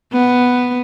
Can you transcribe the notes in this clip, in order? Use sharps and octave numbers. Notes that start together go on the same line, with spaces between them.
B3